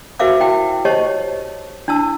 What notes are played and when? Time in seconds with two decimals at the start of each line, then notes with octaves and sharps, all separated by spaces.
0.19 F#4 A#4 C5 E5 F5 D6
0.41 E4 F#4 G5
0.85 G4 C5 C#5 D#5 A5 C#6
1.88 D4 E4 A5 E6